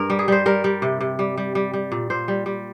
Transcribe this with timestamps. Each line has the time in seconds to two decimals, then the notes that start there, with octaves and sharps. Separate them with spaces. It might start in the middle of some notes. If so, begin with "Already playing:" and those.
Already playing: G2 A#4
0.10 G3
0.19 G#4
0.28 G3 C5
0.46 G3 A#4
0.64 G3
0.82 C3
1.01 C3
1.19 G3
1.37 G3
1.55 G3
1.73 G3
1.92 A#2
2.10 A#2 C5
2.28 G3
2.46 G3